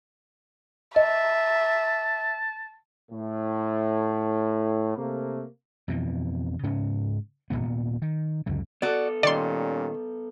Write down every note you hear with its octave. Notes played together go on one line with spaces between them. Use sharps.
D#5 E5 A5
A2
C3 A3 A#3
F2 B2 E3
G#2 C#3 C#4
D#1 E2 A#2 B3
D#3
C#2 F#2 D3
B3 F#4 A4 D5
A#2 D#3 G3 C#4 D5 C6